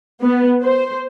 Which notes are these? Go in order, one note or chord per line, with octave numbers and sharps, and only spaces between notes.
B3
C5